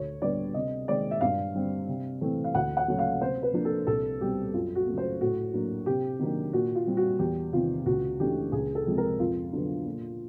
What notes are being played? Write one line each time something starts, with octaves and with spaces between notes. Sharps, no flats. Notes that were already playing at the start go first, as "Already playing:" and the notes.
Already playing: D2 C#5
D3 G3 B3 D5
C3 D#5
D#3 G#3 C4 D5
E5
G2 F5
D3 G3 C4
C3
E3 A3 C4
F5
D2 F#5
F#5
C#3 F#3 A3 C#4
F5
C3 C5
B4
F3 A#3 D4
A4
C2 A4
B2 G3 C4 G4
F#2 F4
F#4
C#3 F#3 A3
C5
A2 F#4
F#3 A#3 D4
C3 G4
D#3 F#3 A#3 D4
A#2 F#4
F4
G3 C4
F#4
E2 G4
C3 D#3 F4
C#2 F#4
C#3 E3 A3 D4 G4
C#2 G#4
A4
C3 F3 G#3 C4
A#4
F2 F4
D3 F#3 B3
A#2